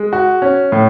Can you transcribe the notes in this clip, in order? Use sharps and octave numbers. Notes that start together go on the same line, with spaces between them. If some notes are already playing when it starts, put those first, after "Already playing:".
Already playing: G#3
F#4
C#4
A2